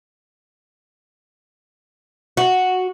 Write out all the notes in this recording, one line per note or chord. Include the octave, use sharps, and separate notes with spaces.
F#4